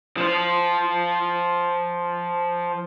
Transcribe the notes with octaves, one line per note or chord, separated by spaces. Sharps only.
F3 C5